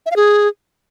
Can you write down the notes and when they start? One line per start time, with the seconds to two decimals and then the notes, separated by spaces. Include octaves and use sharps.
0.06 E5
0.11 F5
0.16 G#4